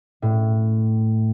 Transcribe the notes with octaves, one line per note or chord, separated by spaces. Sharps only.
A2